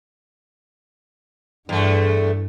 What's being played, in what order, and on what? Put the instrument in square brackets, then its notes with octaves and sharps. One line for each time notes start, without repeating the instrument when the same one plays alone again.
[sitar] E2 A3 [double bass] G2